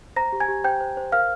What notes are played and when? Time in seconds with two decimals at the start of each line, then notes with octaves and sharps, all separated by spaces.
0.16 C5 A#5 A#6
0.32 G4
0.40 G#5 G#6
0.48 G4
0.64 C5 G5 G6
0.80 C5
0.97 C5
1.12 A#4 F5 F6